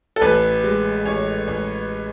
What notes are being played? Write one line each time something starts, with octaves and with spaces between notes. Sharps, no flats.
A4
A1 B4
G#3
A1 C#5
A1